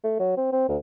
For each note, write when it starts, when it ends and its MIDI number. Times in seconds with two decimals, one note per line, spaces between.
0.04 0.15 57
0.20 0.36 54
0.37 0.50 60
0.52 0.67 60
0.68 0.77 38